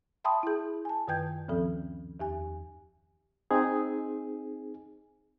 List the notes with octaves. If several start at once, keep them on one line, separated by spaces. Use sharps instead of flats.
E5 G5 A5 B5 C6 D#6
E4 G#4
G#5 A5
F#2 D#3 B4 G5 G6 G#6
D2 G2 D#3 F3 C4 A4
E2 G4 G#5
C4 D#4 G#4